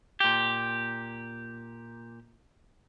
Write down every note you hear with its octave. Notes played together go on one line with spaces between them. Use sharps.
A#2 G4